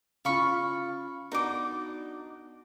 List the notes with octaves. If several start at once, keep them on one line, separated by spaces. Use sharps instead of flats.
C#3 F4 F5 B5 C#6
B3 D4 D#4 F#4 D6